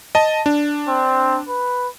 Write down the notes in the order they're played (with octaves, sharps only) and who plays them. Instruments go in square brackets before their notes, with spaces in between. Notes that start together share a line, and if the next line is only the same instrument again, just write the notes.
[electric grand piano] D#5 A5
D4
[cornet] C4
B4